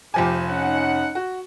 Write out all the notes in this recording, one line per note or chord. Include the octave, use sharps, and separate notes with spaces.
F1 F3 G4 G#5
C#4 D#4 F#5
F#4